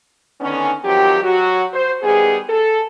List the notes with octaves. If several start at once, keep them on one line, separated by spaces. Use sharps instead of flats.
D3 D#3 B3 C#4
D#3 F3 F#3 C4 G4
F#3 F#4
C5
D#3 G3 B3 G#4
A4